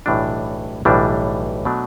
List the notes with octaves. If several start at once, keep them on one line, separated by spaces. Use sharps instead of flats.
B1 A2 E3 G3 D4
B1 A2 E3 G3 D4
B2 F#3 A3 D4